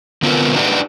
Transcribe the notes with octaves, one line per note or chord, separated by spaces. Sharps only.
D3 B3 C4 F4 A#4 B4
D4 D#4 F#4 G4 B4 D5